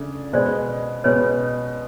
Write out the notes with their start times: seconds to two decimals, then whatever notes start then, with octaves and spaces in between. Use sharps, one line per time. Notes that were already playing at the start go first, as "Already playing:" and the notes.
Already playing: C#3 A3 D4
0.33 B2 G#3 B3 C5 D5
1.04 B2 G#3 B3 B4 C#5